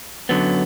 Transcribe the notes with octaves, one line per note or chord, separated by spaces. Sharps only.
F#2 D3 F#3 B3